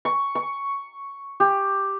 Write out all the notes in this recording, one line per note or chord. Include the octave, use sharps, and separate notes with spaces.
C#6
C#6
G4